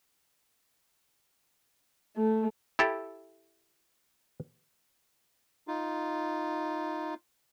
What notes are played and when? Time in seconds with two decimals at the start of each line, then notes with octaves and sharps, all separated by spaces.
2.17 A3
2.79 E4 G4 A4
5.68 D#4 F4